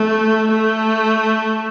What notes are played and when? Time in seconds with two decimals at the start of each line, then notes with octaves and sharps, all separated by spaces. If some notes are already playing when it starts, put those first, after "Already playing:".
Already playing: A3
0.52 A3